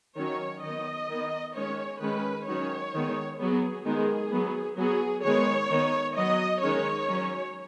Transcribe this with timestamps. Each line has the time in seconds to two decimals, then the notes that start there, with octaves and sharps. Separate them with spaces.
0.17 D#3 F#3 C#4 C#5
0.63 D#3 B3 D#5
1.09 D#3 B3
1.55 D#3 G#3 C#4 C#5
2.01 D#3 G#3 C#4 B4
2.47 D#3 F#3 C#4 C#5
2.94 D#3 G#3 B3
3.40 F#3 B3 G#4
3.86 D#3 G#3 B3 G#4
4.32 F#3 B3
4.78 F#3 B3 G#4
5.24 D#3 G#3 B3 C#5
5.70 D#3 B3
6.17 F#3 B3 D#5
6.62 D#3 G#3 C#4 C#5
7.09 F#3 C#4